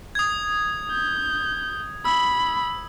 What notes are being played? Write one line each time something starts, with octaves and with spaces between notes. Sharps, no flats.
D#6 G#6
G6
B5 E6